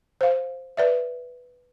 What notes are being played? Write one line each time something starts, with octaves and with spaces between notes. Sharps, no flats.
C5 F5
B4 D5 E5